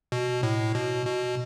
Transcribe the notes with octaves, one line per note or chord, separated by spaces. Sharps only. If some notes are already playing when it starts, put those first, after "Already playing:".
B2
A2
B2
B2